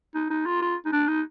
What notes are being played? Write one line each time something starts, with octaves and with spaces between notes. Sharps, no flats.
D#4
D#4
F4
F4
D#4
D4
D#4